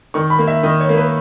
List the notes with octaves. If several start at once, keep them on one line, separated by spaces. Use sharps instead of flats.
D#3 C#6
B5
A#3
E5
D#3 D#5
C#5
A#3
B4